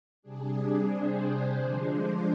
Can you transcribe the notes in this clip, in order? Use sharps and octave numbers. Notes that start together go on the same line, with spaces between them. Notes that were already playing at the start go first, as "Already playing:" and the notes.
C3 G3 D4 G#4
C5
D3 F3 G#3 D4